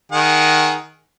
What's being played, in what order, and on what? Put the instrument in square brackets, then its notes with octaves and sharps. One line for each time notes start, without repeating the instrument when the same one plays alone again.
[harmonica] D#3 G#4 F#5